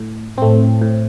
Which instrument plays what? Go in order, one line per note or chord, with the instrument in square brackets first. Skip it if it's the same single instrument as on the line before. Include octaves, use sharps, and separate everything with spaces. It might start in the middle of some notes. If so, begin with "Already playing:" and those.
Already playing: [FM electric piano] A2
[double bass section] A2 [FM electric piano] A3 C4
[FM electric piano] A2